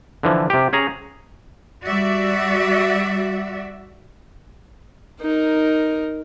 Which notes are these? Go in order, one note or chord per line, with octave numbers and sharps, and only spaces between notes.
D3 E3 F3
C3 G4
C#4 G#4 A#5
G3 F#4 D5 E5
D#4 A#4